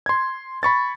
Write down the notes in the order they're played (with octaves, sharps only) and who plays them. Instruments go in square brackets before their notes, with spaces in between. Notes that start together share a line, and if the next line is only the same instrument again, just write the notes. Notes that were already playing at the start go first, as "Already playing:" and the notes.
[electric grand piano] C6 G#6
B5 C#6 A6